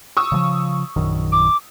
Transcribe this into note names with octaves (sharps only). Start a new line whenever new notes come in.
C#6 D#6 E6
C#3 E3 F3
A#1 F#2 D#3
D6